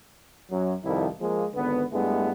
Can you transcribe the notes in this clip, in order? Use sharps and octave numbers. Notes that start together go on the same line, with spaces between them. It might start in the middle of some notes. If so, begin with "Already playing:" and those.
F#2 F#3
C2 F2 D#3 F3 E4
F3 G#3 A#3
G#1 D3 B3
G2 G#3 A3 B3 E4